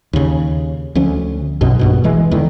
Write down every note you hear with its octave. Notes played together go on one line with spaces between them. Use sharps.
D#2 C#3
D2 F3 C#4
B1 F#2 B2
A#1 G2 B2
E1 E3 G#3
E2 D3 D#3